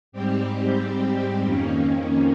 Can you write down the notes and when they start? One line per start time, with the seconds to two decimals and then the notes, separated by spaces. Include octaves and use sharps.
0.12 G#2 G3 C4 G4
1.41 F2 D#3 A#3 C#4